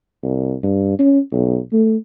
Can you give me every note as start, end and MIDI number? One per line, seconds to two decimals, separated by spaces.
0.23 0.54 36
0.63 0.96 43
0.99 1.19 61
1.32 1.59 35
1.73 1.96 57